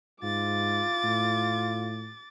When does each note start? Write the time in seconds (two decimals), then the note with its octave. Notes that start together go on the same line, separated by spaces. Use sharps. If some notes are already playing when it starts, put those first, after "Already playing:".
0.23 G#2 F4 D6 A6
1.04 A2